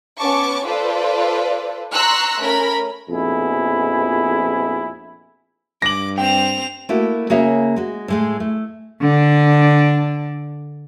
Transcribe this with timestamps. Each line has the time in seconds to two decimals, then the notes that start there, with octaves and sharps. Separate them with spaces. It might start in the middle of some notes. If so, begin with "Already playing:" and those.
0.18 B3 C#4 A5 C#6 D6
0.64 F4 A4 B4 C5 D5
1.92 A#5 C6 C#6 E6 F#6
2.41 A3 C#4 A#4 B5
3.09 A#1 F2 B2 E4 G#4
5.82 G2 D6 A#6 F#7
6.18 C4 C5 G5 F7
6.89 A3 A#3 E4 F#4
7.30 C#3 A#3 F#4 G#4 C#5 E5
7.76 G#3 F#4
8.08 A2 G#3 A3
8.40 A3
9.01 D3 D4